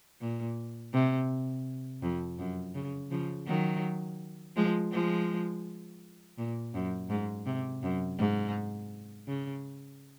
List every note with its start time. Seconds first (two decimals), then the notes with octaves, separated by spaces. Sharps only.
0.21 A#2
0.93 C3
2.02 F2
2.39 F#2
2.75 C#3
3.11 C#3 F3
3.47 D#3 F#3
4.56 F3 G#3
4.92 F3 G#3
6.37 A#2
6.74 F#2
7.10 G#2
7.46 C3
7.83 F#2
8.18 G#2
9.27 C#3